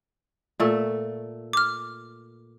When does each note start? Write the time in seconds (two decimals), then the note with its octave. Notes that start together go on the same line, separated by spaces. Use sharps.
0.60 A#2 A3
1.53 D6 F6